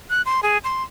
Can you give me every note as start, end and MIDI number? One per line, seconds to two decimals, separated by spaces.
0.10 0.22 90
0.26 0.41 84
0.43 0.58 68
0.64 0.83 84